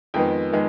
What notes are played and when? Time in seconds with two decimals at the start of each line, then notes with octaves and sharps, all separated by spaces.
0.14 F2 D#3 G#3 B3 G5
0.52 D#3 G#3 B3